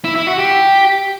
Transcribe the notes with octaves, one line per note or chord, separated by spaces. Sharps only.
E4
E4
F#4
G4